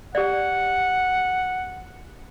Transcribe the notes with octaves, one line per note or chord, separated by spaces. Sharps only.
G4 D5 F#5